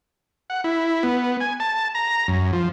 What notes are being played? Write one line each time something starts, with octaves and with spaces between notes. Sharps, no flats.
F#5
E4
B3
G#5
A5
A#5
F#2
F3